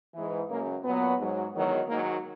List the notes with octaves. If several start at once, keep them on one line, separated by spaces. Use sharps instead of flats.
G#2 E3
F#2 C#3 F#3 A#3
A#2 F#3 B3
G#2 F#3
E2 D#3 F#3
G#2 D#3 F#3 A#3